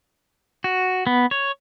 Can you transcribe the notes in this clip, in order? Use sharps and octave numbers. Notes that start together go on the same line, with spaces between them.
F#4
B3
C#5